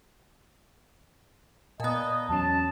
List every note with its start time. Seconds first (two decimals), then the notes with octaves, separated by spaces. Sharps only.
1.80 A#2 B3 D#5 A5 A#5
2.29 E2 F#3 C#4 A5